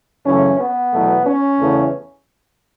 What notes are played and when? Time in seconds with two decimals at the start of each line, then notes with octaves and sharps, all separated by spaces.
0.24 F#2 C#3 E3 A3 C#4
0.59 B3
0.92 E2 B2 F#3 A3
1.26 C#4
1.60 E2 C#3 A3